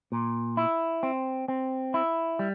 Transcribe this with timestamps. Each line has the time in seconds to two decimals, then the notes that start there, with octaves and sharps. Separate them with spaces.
0.12 A#2
0.57 E4
1.03 C4
1.48 C4
1.94 E4
2.39 G3